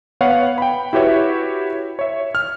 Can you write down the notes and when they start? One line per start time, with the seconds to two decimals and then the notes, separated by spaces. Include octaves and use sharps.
0.21 B3 B4 C#5 F5 F#5
0.58 G5 B5
0.93 E4 F#4 G4 B4 C#5 E5
1.99 C#5 E5
2.35 F6